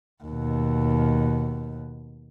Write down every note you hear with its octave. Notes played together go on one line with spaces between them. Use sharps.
D#2 B2